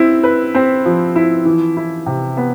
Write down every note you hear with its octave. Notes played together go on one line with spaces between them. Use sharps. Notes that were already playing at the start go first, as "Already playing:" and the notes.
Already playing: C4 E4
B4
C4
F3
E4
E3
E4
C3
B3